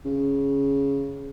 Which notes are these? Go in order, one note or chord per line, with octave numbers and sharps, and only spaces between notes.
C#3